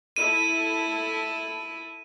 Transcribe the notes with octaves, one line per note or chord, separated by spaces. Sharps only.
E4 A4 D#7